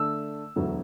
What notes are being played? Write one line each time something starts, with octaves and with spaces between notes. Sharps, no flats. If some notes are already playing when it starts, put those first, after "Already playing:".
Already playing: D3 A3 D4 A4 D5 E6
E1 D2 D3 F#3